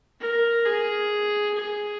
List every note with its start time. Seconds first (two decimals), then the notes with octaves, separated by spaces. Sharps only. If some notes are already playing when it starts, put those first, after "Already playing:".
0.20 A#4
0.65 G#4
1.54 G#4